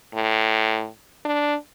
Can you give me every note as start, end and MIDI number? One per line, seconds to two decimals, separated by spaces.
0.14 0.88 45
1.25 1.55 62